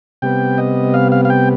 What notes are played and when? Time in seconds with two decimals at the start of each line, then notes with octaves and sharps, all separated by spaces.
0.22 C3 G3 B3 G5
0.58 D#5
0.94 F5
1.12 F5
1.25 F5
1.30 G5